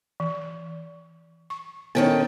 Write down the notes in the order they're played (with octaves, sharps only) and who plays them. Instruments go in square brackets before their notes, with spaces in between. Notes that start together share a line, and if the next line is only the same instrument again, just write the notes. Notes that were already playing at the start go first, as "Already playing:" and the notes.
[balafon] E3
C#6
[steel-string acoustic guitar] D3 D#3 C#4 [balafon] B3